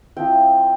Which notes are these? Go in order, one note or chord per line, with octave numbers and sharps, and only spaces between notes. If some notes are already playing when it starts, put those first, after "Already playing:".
F3 C4 E4 G5